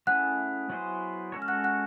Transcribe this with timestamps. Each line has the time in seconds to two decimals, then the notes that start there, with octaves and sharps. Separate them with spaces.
0.07 A3 C#4 E4 G#4 F#5 F#6
0.70 F#3 B3 E4 G#4 C5
1.32 G#3 C#4 F#4 A4 C#5
1.42 F6
1.48 F#5 F#6
1.64 F#5 F#6